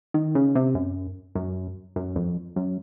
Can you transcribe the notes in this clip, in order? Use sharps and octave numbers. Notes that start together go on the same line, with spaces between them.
D#3
C#3
C3
F#2
F#2
F#2
F2
F#2